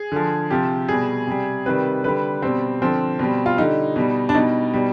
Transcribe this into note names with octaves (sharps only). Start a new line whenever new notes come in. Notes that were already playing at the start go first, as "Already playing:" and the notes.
Already playing: G#4
D3 F3
C3 F3 G4
B2 G3 G#4
C3 G3
C3 D#3 G3 B4
D3 G3 B4
B2 G3 C4
D3 F3 C4
B2 G3
F4
D3 G3 D#4
B2 G3
D4
B2 G3 D#4
B2 G3